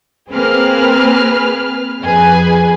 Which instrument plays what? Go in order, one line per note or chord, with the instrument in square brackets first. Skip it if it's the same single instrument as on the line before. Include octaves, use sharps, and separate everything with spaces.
[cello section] A#3 C4 [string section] G#4 B4 F6
[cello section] F2 [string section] G#4 B4 G#5